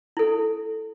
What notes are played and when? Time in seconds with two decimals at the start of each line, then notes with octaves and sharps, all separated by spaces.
0.17 E4 A4